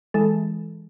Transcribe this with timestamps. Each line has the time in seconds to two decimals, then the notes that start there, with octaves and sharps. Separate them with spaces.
0.14 E3 G#3 A4